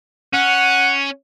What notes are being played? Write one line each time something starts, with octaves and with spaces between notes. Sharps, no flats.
C#4 F#5